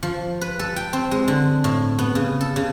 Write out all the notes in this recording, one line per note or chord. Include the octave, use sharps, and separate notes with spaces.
F3
B4
A4
G5
C4
G#3
D3
A2
B3
C#3
A4
C#3